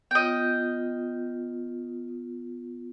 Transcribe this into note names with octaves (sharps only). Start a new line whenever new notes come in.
B3 F4 D#5 G5